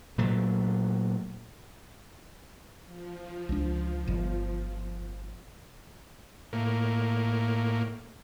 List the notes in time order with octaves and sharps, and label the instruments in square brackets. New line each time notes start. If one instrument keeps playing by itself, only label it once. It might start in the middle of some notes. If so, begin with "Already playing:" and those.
[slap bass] A#2 F#3 A3
[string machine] F3
[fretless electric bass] C#2 D4
G1
[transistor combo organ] A2 A#3